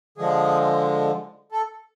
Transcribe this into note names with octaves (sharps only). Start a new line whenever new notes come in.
D3 F3 G#3 G#4
A4